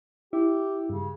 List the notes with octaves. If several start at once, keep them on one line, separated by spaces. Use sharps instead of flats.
E4 G4
G2 C#3